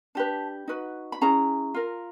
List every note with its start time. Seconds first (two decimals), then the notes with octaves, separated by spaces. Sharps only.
0.15 D4 G4 B4 A5
0.68 D#4 F#4 B4
1.12 B5
1.21 C#4 E4 G#4 A#5
1.74 F4 A#4